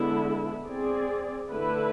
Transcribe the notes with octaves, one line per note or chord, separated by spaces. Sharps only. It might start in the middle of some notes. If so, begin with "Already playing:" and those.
Already playing: D3 G#3 B3 E4
C4 G#4 D5
D3 A3 E4 B4